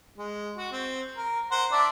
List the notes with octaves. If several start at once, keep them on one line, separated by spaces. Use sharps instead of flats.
G#3
F#4
C4
A#4
A#4 C5 F#5
D4 D5 E5